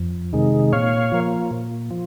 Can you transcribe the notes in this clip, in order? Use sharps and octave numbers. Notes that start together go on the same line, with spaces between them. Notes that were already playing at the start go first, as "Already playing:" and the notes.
Already playing: F2
C3 D#3 G#3
A#2 C#5 F5
F3 A#3
A#2
F3